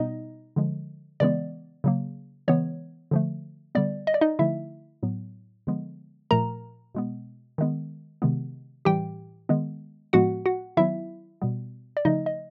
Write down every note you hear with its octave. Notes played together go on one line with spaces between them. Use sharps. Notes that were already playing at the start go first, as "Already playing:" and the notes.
Already playing: B2 G3 B3 D#4 D#5
D3 F3 G#3
C#3 E3 G#3 B3 D5
C#3 F#3 A#3
C#3 E3 G#3 B3 C#5
D3 F3 A3
D3 G3 B3 D5
D#5
D5
D#4 D#5
D3 F3 A3 E4 E5
A2 F#3 B3
D3 F3 G#3 B3
A#2 F3 A3 A#4 A#5
B2 G#3 B3
D#3 G#3 B3
C3 D#3 G#3 B3
A2 E3 G3 G4 G5
D#3 G#3 B3
A2 F3 G#3 B3 F#4 F#5
F#4 F#5
D#3 F#3 B3 E4 E5
B2 G3 B3
D5
C#3 F3 A3 D#4 D#5
D#5